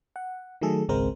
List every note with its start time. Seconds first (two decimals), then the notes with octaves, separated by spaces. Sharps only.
0.16 F#5
0.61 D#3 F#3 A3 G#4 A4
0.89 G#1 C#2 G#3 C4 A#4 C5